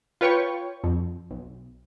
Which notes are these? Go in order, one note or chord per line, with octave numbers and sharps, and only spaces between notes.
F4 B4 C#5 G5 C#6
F2
B1